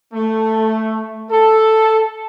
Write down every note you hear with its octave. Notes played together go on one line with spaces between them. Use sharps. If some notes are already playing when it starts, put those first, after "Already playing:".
A3
A4